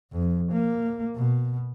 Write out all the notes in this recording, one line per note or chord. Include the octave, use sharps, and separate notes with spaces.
F2
A#3
B2